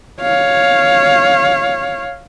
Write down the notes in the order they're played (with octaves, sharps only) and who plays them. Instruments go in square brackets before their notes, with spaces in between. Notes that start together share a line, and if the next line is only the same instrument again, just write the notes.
[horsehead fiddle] C#5 F5